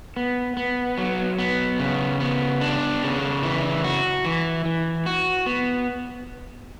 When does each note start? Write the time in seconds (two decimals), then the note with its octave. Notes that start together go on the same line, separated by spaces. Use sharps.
0.17 B3
0.57 B3
0.98 F#3
1.39 B3
1.79 C#3
2.20 B3
2.61 D4
3.03 C#3
3.43 E3
3.84 F#4
4.25 E3
4.65 E3
5.06 F#4
5.46 B3